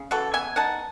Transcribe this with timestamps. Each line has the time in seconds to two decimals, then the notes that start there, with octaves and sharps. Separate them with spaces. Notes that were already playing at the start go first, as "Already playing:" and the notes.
Already playing: C#3
0.11 E3 F#4 A4
0.34 B3 E5 G#5
0.56 D#4 F#5 A5